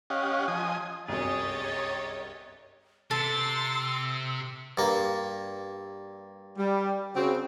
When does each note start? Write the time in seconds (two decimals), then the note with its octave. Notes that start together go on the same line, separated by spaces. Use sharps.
0.10 C#4 G4 D#5 F5 F#5
0.48 F3 D#5 G#5 D#6
1.08 G1 C2 F#2 G4 G#4 C#5 D#5 A6
3.11 C3 A4 C6 E6 A6
4.77 G2 A#3
6.58 G3
7.15 C#3 C4 F#4